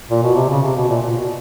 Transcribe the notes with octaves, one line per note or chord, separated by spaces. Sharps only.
A#2
B2
C3
C#3
C3
B2
A#2
A#2
B2